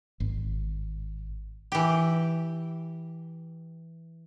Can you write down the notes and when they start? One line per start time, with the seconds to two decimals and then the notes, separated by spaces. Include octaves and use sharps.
0.20 G#1
1.72 E3 G4